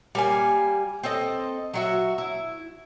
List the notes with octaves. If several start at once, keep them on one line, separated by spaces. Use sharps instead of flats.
G3 A#3 G#5
C4 A4 D#5
F#3 F#4 E5
E4